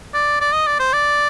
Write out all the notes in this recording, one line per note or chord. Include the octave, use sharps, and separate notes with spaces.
D5
D5
D#5
D5
C5
D5